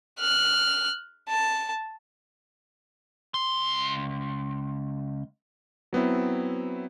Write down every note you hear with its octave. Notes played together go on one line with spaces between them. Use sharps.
F6 F#6
A5
C#2 C6
F#3 B3 C4 E4